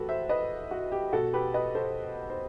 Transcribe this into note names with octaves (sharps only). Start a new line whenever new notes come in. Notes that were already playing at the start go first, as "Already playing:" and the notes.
Already playing: A2 E3 F#4 G4 A4 B4
C5 E5
B4 D#5
F#4
G4
B2 F#4 A4
G4 B4
B4 D#5
A4 C5
C5